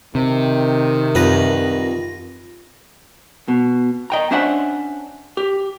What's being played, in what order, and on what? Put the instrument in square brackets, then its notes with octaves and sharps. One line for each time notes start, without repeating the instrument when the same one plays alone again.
[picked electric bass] C3 [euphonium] D#3
[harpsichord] C2 B4 [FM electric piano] F#2 F4 A#6
[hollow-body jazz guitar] B2
D#5 G5 A#5
C#4 D4 C5 E5 F#5
G4